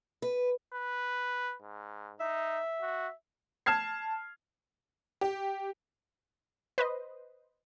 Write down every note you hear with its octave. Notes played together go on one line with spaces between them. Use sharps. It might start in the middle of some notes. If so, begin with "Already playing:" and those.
B4
B4
G#2
D#4 E5
F#4
A5 F6 G#6 C7
G4
B4 C5 D#5